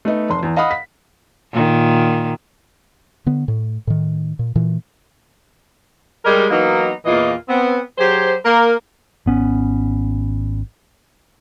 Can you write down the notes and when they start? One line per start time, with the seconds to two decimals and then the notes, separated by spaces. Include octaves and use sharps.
0.05 A3 B3 D#4
0.29 F1 C6
0.43 E2
0.57 D#5 F5 F#5 B5 D#6
0.71 B6
1.52 A#2 D#3
3.26 D3 B3
3.48 A2
3.87 A2 D#3
4.39 A#2
4.55 A#2 E3
6.25 G3 G#3 A#4
6.50 E3 F#3 A#3 B3 D#4
7.06 E2 A#2 E3 A#3 F4 D#5
7.49 B3 C4
7.98 F#3 G4 G#4 C5
8.45 A#3 A#4
9.26 G#1 B3 C#4